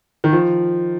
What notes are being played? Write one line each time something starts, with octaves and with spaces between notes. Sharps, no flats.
D#3
F3